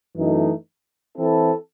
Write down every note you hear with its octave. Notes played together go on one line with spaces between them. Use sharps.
F#2 E3 A3 D#4
E3 C4 E4 A4